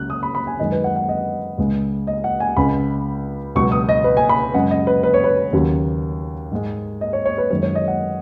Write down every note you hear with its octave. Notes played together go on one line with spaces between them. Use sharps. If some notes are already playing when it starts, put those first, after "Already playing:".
Already playing: C#2 C#3 F#3 F#6
D#6
B5
B5
G#5
F#2 D#3 G#3 D#5
B4
F#5
F#5
D#5
C#2 C#3 G#3
D#5
F#5
G#5
C#2 C#3 G#3 B5
C#2 B2 F#3 C#6
D#6
D#5
B4
G#5
B5
F#2 C#3 G#3 F#5
D#5
B4
B4
C#5
B4
D#2 C#3 F#3
G#2 G#3
D#5
C#5
C#5
B4
F#2 D#3 G#3 C#5
C#5
D#5
F#5